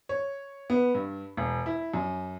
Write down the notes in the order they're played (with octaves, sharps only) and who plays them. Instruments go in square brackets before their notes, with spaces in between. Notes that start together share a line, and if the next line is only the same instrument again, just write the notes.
[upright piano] C#5
B3
G2
E1
E4
F#2